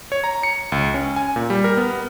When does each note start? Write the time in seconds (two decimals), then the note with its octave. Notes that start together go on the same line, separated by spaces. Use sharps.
0.12 C#5
0.24 A#5
0.43 C#7
0.72 C#2
0.94 C#4
1.16 G#5
1.36 A#2
1.50 G3
1.64 A#4
1.77 B3